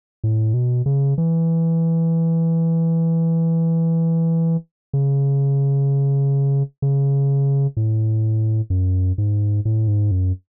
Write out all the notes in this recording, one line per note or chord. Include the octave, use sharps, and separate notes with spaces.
A2
B2
C#3
E3
C#3
C#3
A2
F#2
G#2
A2
G#2
F#2